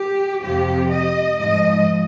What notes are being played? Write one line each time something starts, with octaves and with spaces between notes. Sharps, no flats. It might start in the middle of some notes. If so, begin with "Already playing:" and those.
Already playing: G4
F2 C3 F3 G4
D#5
G#2 F3 D#5